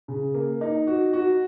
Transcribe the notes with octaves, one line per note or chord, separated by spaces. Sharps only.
C#3
A#3
D#4
F#4
F#4